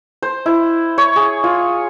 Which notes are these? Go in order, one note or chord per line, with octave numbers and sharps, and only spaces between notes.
C5
E4
C#5
G#4
F4